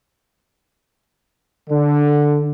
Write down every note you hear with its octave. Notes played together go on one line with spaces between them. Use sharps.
D3